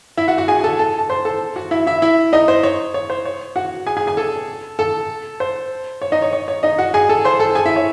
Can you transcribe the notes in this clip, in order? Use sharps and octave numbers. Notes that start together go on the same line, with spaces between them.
E4 E5
F#4 F#5
F#4 F#5
G#4 G#5
G#5
A4 A5
A4 A5
A5
C5 C6
A4 A5
F#4 F#5
E4 E5
E4 E5
E4 E5
D#4 D#5
C5
C#5
C#5
C5
C#5
F#4 F#5
G#4 G#5
G#4 G#5
G#4 G#5
A4 A5
A4 A5
C5
C#5
D#4 D#5
C#5
C#5
C#5
D#4 D#5
F#4 F#5
G#4 G#5
A4 A5
C5 C6
A4 A5
G#4 G#5
E4 E5
C#5